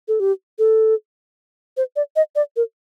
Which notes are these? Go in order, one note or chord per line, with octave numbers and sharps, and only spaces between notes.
A4
G4
A4
C5
D5
D#5
D5
A#4